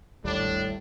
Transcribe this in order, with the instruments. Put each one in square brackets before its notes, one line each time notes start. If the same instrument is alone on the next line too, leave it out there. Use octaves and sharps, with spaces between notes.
[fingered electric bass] D1 G#1 D#2 [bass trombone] A2 [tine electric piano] G3 [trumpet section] D4